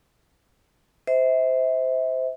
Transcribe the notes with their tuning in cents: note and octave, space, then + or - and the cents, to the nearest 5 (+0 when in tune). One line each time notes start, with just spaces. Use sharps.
C5 -15 E5 -30